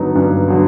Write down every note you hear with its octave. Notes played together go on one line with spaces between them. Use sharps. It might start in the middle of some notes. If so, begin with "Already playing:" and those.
Already playing: G2 D3 F#3 B3 D#4
G2
D3 F#3 B3